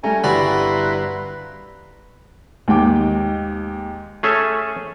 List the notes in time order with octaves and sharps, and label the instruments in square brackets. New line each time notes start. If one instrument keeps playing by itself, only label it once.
[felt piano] G3 A3 C#4 [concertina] G#5 A#5
[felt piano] G1 [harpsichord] G3 F#4 D5 [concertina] E4 A#5 C6 [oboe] B4
[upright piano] D#2 G#2 G5 D6
[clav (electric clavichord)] A3 C#4 G#4 A4 C#5 E5